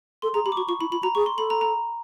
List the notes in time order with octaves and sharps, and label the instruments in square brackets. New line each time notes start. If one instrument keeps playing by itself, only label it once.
[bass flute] A4 [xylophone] C6
[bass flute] G#4 [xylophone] A#5
[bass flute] G4 [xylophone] B5
[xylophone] D6
[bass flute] F#4 [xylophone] C#6
[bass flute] F4 [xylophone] C#6
[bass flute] E4 [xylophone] B5
[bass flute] F4 [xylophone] B5
[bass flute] F#4 [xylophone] A#5
[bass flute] G#4 [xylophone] C#6
[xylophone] C6
[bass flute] A4 [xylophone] B5
[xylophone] A#5
A#5